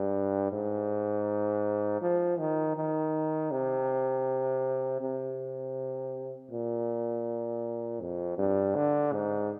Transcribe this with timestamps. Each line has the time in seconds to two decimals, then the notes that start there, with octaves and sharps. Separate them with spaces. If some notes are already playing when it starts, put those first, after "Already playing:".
Already playing: G2
0.52 G#2
2.01 F3
2.39 D#3
2.76 D#3
3.51 C3
5.01 C3
6.51 A#2
8.00 F2
8.38 G2
8.75 D3
9.13 G#2